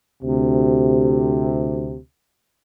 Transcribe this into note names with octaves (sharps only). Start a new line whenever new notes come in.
D2 C3